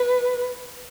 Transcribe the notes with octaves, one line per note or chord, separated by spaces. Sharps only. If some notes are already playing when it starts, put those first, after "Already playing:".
Already playing: B4